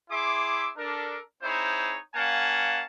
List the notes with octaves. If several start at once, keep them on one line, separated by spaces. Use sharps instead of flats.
E4 G#4 E5 C6 D6
D4 A4 A#4
C4 D#4 E4 G#4 C5 C#5
A#3 C#4 F5 F#5 G#5 A5